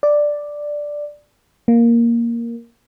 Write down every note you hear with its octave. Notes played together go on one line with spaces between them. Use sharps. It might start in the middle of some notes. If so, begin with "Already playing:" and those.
D5
A#3